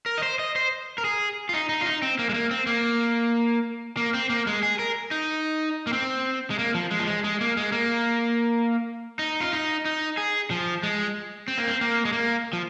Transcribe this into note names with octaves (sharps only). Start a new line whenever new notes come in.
A#4
D#5
C5
D#5
C5
A#4
G#4
F4
D#4
D#4
F4
D#4
C4
A#3
G#3
A#3
C4
A#3
A#3
C4
A#3
G#3
G#4
A#4
D#4
A#3
C4
G#3
A#3
F3
G#3
F3
G#3
G#3
A#3
G#3
A#3
D#4
F4
D#4
D#4
G#4
F3
G#3
C4
A#3
C4
A#3
G#3
A#3
F3